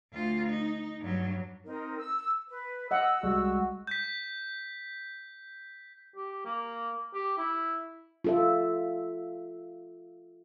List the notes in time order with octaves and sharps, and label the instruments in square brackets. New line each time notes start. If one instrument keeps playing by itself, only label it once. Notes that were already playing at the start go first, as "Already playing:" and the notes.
[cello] D2 F4
D#4
G2 F#3
[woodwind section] C4 D#4 A#4
E6
B4
[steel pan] D#5 F#5 [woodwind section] E6
[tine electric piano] C2 G3 G#3 [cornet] F#4
[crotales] G6 B6
[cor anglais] G4
A#3
G4
E4
[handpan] F4 A4 E5